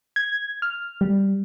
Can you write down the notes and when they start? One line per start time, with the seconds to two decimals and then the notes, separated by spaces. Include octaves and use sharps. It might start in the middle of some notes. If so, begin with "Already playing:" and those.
0.16 G#6
0.62 F6
1.01 G3